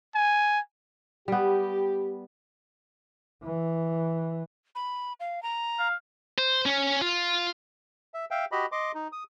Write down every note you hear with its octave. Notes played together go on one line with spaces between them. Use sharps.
G#5
G3 B3 G4
E3
B5
F5
A#5
F5
C5
C#4
F4
E5
E5 F5 G5
F#4 G4 D#5 B5
D#5 C6 D6
D#4
D#6